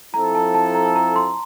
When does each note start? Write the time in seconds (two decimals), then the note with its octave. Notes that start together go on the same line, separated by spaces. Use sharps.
0.14 F3 C4 E4 A4 A#5
0.35 A5
0.54 A5
0.75 A#5
0.96 A#5
1.16 C6